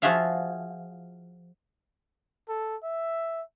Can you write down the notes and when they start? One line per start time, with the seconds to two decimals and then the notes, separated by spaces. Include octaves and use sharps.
0.02 F3 F4 F#4 G#4 E5 F5
2.49 A4
2.83 E5